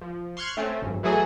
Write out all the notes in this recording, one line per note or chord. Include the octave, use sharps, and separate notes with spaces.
F3
C6 C#6 F6 F#6 G#6
A3 C4 C#4
G#1 F#2
E3 F#3 A3 F#4 G#4 D#5